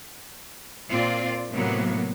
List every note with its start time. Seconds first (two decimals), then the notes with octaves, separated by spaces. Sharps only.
0.90 A#2 C4 F4 D5
1.52 A2 C3 F#3 A#3 B3